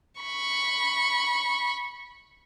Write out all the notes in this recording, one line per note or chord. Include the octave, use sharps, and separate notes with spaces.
B5 C#6